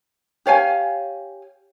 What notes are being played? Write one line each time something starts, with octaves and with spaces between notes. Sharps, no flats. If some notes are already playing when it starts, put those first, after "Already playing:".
G4 C#5 F5 G#5